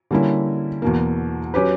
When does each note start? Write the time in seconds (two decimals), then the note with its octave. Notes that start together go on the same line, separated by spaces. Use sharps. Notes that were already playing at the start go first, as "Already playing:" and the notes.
0.11 D3 G3 A#3 C#4 E4
0.82 E2 B2 A#3
1.54 F#3 C#4 G4 B4